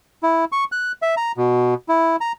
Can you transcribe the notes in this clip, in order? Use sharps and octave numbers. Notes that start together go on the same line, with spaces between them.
E4
C#6
F#6
E5
A#5
B2
E4
A#5